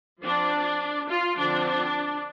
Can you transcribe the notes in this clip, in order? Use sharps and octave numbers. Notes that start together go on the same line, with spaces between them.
F3 C4 D4
F4
D3 F3 C4 D4